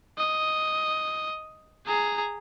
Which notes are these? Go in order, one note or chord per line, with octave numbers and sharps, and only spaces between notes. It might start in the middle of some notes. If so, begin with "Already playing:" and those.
D#5
G#4 A#5